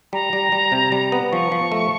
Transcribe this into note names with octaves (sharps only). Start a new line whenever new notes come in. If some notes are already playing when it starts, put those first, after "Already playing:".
G3 A#5
G3
G3
C3
G3
B3
F3 C#6
F3
A3